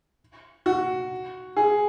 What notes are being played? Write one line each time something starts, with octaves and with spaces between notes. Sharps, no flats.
F#4
G#4